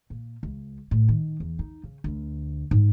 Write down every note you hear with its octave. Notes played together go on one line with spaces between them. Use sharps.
A#2
C#2
A2
D#3
E2
D#4
C#3
D2
G#2